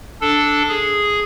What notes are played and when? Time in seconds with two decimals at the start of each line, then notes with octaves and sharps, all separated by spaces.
0.21 D4 A4
0.69 G#4